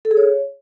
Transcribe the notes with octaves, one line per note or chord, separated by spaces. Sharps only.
A4
G#4
C#5